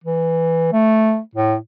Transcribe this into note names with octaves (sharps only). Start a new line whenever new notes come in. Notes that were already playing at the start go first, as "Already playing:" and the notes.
E3
A3
A2